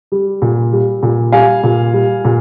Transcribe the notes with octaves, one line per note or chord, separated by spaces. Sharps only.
G3
A#2
G3
A#2
G3 F5 G#5
A#2
G3
A#2